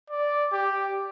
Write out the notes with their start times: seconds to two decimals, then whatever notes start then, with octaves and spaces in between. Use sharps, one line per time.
0.10 D5
0.52 G4